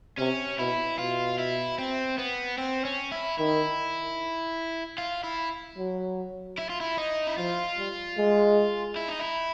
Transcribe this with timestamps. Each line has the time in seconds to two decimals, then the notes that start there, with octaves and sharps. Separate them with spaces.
0.18 C3 C#4
0.58 B2 E4
0.98 B2 F4
1.38 E4
1.78 C4
2.18 B3
2.58 C4
2.85 C#4
3.12 E4
3.38 D#3 E4
4.98 F4
5.24 E4
5.77 F#3
6.58 E4
6.69 F4
6.81 E4
6.98 D#4
7.27 E4
7.37 F3 F4
7.78 G3
8.17 G#3
8.96 E4
9.09 D#4
9.20 E4